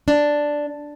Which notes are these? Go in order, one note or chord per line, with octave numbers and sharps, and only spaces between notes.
D4